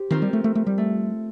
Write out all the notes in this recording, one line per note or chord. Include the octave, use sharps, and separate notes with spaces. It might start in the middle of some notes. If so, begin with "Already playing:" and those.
Already playing: G4 C5
D#3 F3 C4 F4 A#4
G3
A3
A3
A3
G3
A3